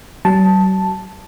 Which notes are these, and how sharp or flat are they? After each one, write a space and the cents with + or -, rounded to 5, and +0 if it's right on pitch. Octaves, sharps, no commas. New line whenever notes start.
F#3 +45 A5 +0